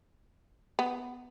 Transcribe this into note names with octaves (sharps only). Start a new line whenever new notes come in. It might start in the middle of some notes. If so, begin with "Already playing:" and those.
B3